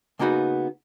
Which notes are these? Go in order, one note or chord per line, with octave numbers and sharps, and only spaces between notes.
C#3 A#3 B3 D#4 F#4 B5